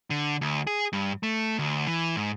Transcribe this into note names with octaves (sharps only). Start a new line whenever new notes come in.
D3
D2
G#4
G2
A3
D2
E3
G#2